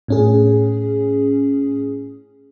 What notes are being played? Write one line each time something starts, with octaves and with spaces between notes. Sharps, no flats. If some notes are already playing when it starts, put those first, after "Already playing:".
A2 C#4 G#4